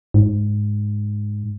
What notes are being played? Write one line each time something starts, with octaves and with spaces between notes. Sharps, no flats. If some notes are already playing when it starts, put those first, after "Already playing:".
G#2